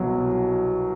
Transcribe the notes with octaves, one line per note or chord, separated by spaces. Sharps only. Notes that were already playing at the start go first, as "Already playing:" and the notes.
Already playing: C2 B2 F#3